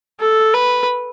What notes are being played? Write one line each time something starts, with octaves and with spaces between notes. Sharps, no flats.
A4
B4